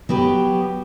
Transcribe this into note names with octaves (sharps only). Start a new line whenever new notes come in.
F#3 B3 G4 B4